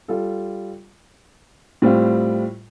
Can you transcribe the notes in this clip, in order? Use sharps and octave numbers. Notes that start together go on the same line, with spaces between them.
G3 F4 A4
A2 G3 C4 F4